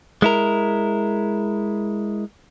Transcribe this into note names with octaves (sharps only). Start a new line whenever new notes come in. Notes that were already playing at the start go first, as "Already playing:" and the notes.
G#3 E4 A#4